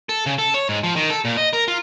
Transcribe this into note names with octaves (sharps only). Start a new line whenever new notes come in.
A4
C#3
A4
C#5
G#2
F3
D#3
A4
A#2
D#5
A#4
F4